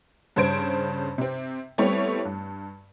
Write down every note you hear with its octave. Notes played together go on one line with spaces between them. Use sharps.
G2 C#3 C5 G#6 D7
C3 C4
G3 A3 B3 C4 E4 C#5
G2